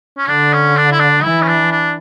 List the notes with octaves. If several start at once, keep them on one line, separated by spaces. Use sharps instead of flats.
C#4
D3 D4
C#4
D4
E4
D4
E3 E4
C#4
D4
D4